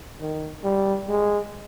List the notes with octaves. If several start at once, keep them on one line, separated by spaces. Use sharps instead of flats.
D#3
G3
G#3